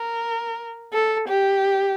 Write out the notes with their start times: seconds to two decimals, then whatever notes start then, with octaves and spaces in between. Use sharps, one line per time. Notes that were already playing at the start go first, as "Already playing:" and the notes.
Already playing: A#4
0.93 A4
1.28 G4